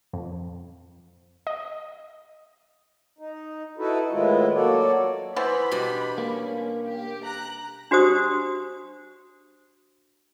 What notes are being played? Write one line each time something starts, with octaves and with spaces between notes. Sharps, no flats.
F2
D#5
D#4
D#4 E4 F#4 A4 B4
A2 D#3 G#3 B3 E4 F4
F#3 A#3 F#4 A4 C#5 D5
E3 B3 C5 B5
B2 G3 D4
A#3 C#4
G4
A#5 F#6
D4 F#4 G4 C5 D#6